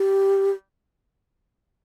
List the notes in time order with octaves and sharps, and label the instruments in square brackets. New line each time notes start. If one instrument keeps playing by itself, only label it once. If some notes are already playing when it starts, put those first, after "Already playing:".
Already playing: [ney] G4